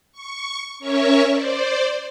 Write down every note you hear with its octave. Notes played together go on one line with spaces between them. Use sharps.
C#6
C#4 A#4 C#5 E5 C#6
C5 D5